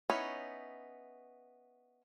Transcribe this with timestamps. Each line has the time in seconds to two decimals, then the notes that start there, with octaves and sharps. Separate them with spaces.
0.10 B3 C#4 D#4 E4 C#5